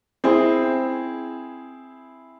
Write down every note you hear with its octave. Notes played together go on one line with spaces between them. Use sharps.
C4 E4 G#4